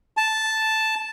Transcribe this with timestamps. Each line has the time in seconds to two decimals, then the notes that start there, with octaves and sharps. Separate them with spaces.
0.17 A5